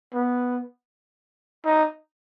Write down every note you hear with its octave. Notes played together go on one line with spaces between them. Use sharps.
B3
D#4